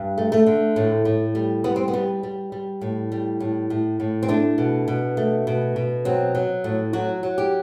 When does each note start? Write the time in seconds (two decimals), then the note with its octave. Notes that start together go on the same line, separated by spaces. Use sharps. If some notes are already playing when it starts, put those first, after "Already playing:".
Already playing: G2
0.18 A3
0.32 A3
0.47 D3
0.76 A2
1.05 A2
1.35 G3
1.64 G3 B3
1.76 C4
1.88 B3
1.93 G3
2.23 G3
2.52 G3
2.81 A2
3.12 G3
3.40 A2
3.70 A2
4.00 A2
4.23 C4
4.28 A3 D4
4.58 B2
4.88 B2
5.17 A3
5.47 B2
5.76 B2
6.05 F#3 C4
6.35 F#3
6.64 A2
6.93 F#3 F#4
7.23 F#3
7.38 G4